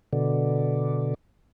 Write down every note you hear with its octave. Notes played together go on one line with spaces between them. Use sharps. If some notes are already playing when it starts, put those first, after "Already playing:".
B2 D3